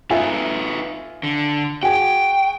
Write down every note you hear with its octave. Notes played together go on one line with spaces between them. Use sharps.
D#4 F4 A4 B4 E5 G#5
D3
F#4 G#4 G5 G#5